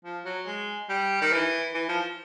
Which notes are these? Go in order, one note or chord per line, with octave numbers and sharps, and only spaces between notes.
F3
F#3
G#3
G3
D#3
E3
E3
F3